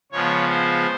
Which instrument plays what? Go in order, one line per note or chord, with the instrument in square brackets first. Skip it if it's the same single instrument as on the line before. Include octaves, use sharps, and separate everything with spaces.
[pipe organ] C#3 F3 G#3 B3 C#5
C5